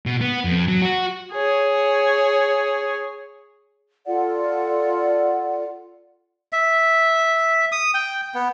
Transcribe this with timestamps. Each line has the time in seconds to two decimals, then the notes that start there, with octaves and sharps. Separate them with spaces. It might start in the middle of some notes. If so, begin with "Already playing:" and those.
0.06 B2
0.21 B3
0.45 F2
0.68 F#3
0.82 F#4
1.32 G#4 C#5
4.06 F4 A4 D5 F#5
6.53 E5
7.72 D#6
7.94 G5
8.34 B3